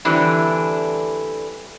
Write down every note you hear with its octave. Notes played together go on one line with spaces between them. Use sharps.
D3 E3 G3 A3 C4 D4